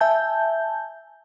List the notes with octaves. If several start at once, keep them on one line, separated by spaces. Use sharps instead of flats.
E5 G#5 A5 G6